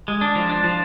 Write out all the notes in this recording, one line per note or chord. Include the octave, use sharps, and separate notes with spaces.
G#3
D4
F3
D4
F3